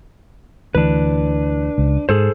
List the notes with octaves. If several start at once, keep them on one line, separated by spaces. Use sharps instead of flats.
D2 E3 D4 B4
C#2
G#2 G#4 A4 C5